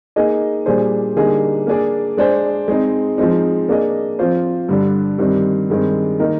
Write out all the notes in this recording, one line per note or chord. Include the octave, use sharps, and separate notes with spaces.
A#3 D#4 G#4 D#5
A#2 G3 D4 G#4 C5
D3 G3 A#3 D#4 G#4
A#3 D4 G#4 D5
G#3 D4 G#4 C5
G#3 C4 D#4
F3 G#3 C4 D#4
A#3 D4 G#4 D#5
F3 C4 F4 C5
G2 D3 G3 D4
G2 D#3 G3 C4
G2 D#3 G#3 C4
D#3 A#3 D#4 A#4